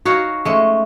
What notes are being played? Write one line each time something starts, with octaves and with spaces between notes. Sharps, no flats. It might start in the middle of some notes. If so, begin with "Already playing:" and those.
D#4 F#4 C#5 F5
G#3 A3 C#4